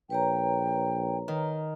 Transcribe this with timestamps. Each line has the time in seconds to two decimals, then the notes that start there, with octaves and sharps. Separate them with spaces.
0.10 A#1 B4 C#5 G5 A#5
1.28 D#3